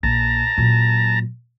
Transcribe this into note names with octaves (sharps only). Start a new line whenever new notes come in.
A#1 A5 A#5
A#2 F#3